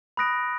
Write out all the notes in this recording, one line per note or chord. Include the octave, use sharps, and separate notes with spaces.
B5 D#6 F#6 A#6 D7